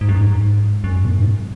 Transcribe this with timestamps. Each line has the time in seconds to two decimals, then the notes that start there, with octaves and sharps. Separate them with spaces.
0.01 G#2
0.09 F#2
0.16 G#2
0.84 F#2
1.04 B2
1.12 G#2